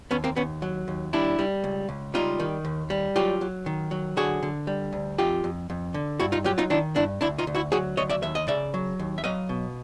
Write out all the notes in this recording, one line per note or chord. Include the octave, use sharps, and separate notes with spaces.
D#2 B3 C#4
A#3 C4
D#2 B3 C#4
F#3
D#2
G3 D4 E4
G3
C#2
C#2
G3 D#4 F4
D#3
D#2
G3
F#3 F4 G4
F#3
D#3
F#3
D3 F#4 G#4
D3
G3
D2
F2 F4 G4
F2
F2
D3
G2 E4 F#4
D#4 F4
F#3 F4 G4
D#4 F4
D#3 D4 E4
G2 D4 E4
D2 D4 E4
D#4 F4
D2
E4 F#4
F#3 F#4 G#4
D2 C#5 D#5
D5 E5
D#2 E5
D#5
C#3 D5 E5
F#3
D#2
E5
F#3 D#5 F5
B2